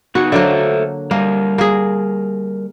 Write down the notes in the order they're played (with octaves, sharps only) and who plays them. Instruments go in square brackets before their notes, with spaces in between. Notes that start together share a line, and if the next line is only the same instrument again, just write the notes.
[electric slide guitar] B3 D#4 G#4 [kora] F#4
[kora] D3 F#3 A#3 [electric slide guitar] A4 C5 E5
[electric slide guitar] G3 A#4 [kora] A#3
[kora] A#3 G#4